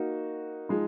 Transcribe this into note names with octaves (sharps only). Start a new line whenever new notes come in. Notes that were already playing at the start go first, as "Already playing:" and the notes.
Already playing: A#3 D#4 F#4
F3 G#3 D#4